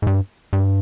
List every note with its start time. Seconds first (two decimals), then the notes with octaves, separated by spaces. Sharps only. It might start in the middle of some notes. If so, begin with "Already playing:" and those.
0.02 G#2
0.07 G2
0.53 G2